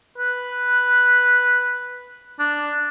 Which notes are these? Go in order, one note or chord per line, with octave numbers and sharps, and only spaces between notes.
B4
D4